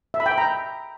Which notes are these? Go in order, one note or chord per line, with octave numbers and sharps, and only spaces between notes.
E5
B5
G5
B5
A#5